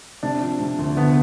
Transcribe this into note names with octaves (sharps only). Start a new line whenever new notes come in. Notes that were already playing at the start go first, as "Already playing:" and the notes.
C3 D4
F3
C3
D2
D3 B3